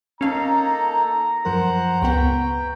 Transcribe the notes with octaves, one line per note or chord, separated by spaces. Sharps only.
A#3 C#4 D#4 A4 F5 A#5
F#2 F3 A#4 C5 F#5
C#2 B3 F#5 G5 C#6